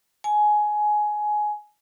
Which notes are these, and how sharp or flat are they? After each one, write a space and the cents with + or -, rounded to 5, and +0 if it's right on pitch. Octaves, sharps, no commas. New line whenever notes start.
G#5 +15